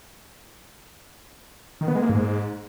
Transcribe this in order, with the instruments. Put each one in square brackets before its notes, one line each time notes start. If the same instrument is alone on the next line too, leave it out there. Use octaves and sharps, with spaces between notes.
[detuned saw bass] D#3
B3
G#3
A#3
G#2